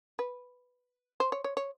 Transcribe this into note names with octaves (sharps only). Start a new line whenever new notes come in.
B4
C5
C#5
C#5
C#5